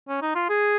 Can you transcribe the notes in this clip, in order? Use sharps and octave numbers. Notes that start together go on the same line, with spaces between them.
C#4
D#4
F4
G#4